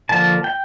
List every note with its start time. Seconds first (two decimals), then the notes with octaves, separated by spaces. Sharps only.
0.09 D3 F3 A#3 A5
0.44 G5